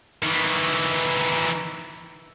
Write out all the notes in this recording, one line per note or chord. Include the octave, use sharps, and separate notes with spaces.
D#3 E3